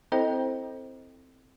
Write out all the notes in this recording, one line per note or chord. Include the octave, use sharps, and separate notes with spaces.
C4 E4 A4 C5 D#5 G5